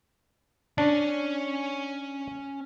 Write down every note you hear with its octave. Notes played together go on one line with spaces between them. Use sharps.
C#4 D4 C#5